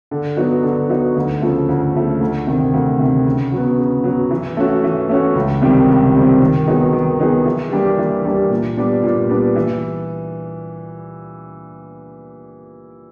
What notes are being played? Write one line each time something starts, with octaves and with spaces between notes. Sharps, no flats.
D3
F#3 B3 D#4 F#4
D3
F#3 B3 D#4 F#4
D2
C#3 F3 A3
D2
C#3 F3 A3
D2
C3 D#3
D2
C3 D#3
C#3
F#3 B3
C#3
F#3 B3
E3
A3 C#4 F#4
E3
A3 C#4 F#4
C#2
C3 D#3 G3 C4
C#2
C3 D#3 G3 C4
D#3
F#3 B3 D#4 G#4
D#3
F#3 B3 D#4 G#4
E3
G3 A#3 D4 G4
E3
G3 A#3 D4 G4
A#2
G3 B3 D4
A#2
G3 B3 D4
E3